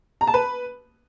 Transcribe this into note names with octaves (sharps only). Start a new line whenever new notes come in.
A#5
A5
B4